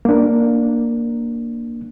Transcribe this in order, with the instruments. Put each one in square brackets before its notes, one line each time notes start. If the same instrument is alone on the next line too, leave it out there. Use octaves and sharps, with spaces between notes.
[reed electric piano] A#3 D4